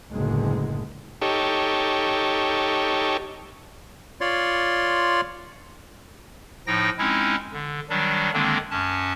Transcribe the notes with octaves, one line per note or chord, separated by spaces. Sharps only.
F#1 C#2 A2 D3 G#3
D#4 G4 A4 C#5
F4 C#5 D5 C6
A2 F3 D#4 G5 A#6
G#3 C4 C#4 D#4 E4
D3
D#3 F#3 G3 D4
D3 D#3 G#3 A#3 C4 D4
F#2 C#4 A5